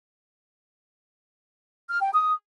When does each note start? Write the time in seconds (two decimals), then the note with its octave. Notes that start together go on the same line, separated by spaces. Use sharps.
1.89 F6
2.01 G5
2.12 D#6